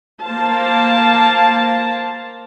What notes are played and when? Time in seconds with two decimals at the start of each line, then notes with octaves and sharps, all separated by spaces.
0.23 A#3 C5 F5 A5